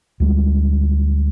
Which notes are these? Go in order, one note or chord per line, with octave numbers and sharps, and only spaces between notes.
D2 G3 G#3